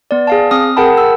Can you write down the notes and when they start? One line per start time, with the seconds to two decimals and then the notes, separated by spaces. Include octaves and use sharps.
0.11 B3 D5
0.27 G#4 F5 A5
0.51 C4 D#6 F6
0.77 G#4 A#4 F#5 G5 A5 B5
0.98 E6